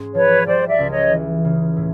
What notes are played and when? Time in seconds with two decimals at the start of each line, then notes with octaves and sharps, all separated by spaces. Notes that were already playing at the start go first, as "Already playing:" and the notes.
Already playing: G#2 G#3 C#4
0.15 F3 B4 C#5
0.46 G3 C5 D5
0.68 D5 E5
0.79 C#2
0.90 C#5 D#5
1.11 E3
1.45 C#3
1.77 A2